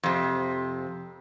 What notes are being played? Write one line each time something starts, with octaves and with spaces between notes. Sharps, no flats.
F2 C3